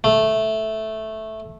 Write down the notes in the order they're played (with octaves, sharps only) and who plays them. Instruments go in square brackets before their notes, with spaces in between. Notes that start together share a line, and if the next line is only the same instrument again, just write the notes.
[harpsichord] A3